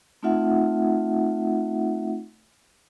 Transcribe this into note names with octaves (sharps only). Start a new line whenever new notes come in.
A3 C4 D#4 F4 E5 F#5